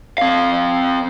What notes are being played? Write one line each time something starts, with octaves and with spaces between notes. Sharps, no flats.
C4 F5